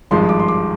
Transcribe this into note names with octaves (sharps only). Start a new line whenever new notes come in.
G#1 G2 F3 G#3 C6
D6
C6
D6